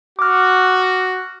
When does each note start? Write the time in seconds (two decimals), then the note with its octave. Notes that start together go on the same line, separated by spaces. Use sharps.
0.19 F#4 D6 F6